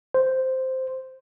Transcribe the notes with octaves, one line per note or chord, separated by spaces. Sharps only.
C5